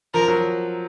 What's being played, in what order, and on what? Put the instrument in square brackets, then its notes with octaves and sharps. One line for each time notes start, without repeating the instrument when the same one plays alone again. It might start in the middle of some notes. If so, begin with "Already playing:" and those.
[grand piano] F3 [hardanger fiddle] A#4
[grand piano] F#3